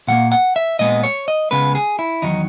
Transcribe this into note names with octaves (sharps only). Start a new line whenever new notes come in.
A#2 F#3 A#3 F#5
F#5
E5
A#2 G#3 B3 D#5
C#5
D#5
C#2 C#3 G#3 B3 B4
G#4
E4
E2 D#3 F#3 D#4